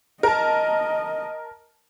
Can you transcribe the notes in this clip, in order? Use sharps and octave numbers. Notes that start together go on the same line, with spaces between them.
A#4 D#5 A5